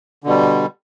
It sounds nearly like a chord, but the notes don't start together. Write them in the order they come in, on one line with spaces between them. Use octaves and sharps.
D3 B2 G3